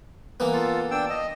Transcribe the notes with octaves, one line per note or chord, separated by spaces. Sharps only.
E3 A#3 B3
F4 A4
D4 G5 E6
D#5